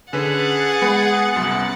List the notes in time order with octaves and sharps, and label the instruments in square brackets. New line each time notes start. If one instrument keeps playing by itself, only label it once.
[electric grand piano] D3 C#4 B4 [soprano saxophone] G#4 [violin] F#5 A6
[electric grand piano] G#3 [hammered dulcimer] B3
[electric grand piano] C2 F#2